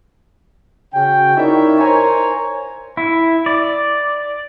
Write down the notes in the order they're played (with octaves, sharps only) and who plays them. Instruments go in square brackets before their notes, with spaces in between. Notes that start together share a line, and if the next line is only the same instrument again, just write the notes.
[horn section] C#3 C#4 F#4 G5
D#4 E4 A#4 C#5 D5 E5
A#4 C5 C#5 G#5 A#5
[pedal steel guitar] E4
D5